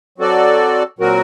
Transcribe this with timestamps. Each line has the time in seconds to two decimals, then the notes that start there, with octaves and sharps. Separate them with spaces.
0.18 F#3 C4 F#4 A4 D5
0.99 A#2 F#3 C4 F#4 A#4